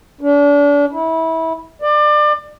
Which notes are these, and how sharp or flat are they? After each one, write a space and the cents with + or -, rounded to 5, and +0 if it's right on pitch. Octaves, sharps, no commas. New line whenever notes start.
D4 -35
E4 -25
D5 +30